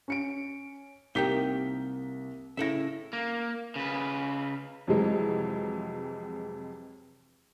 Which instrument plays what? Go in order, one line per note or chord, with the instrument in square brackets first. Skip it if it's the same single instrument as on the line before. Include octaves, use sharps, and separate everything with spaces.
[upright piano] C#4 C#7 D7
[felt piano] C2 B6 [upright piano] A#3 G7 [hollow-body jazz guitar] D#4 G4 G5
[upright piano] C#3 A#6 [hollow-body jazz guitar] E4 A4 E5
[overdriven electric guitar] A#3
C#3 B4
[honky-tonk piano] F2 C3 E3 F#3 G#3